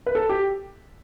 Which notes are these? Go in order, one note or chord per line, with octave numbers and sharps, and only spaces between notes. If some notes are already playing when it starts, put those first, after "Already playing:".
B4
A4
G4